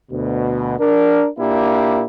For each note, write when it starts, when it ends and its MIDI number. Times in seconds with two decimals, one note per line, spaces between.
0.11 0.76 38
0.11 0.76 47
0.80 1.27 62
0.80 1.27 70
1.39 2.05 46
1.39 2.05 58
1.39 2.05 62
1.39 2.05 64
1.39 2.05 67